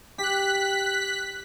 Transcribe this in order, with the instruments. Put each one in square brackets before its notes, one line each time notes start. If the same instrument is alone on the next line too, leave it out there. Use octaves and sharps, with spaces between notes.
[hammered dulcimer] G4 [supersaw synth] F#6 B6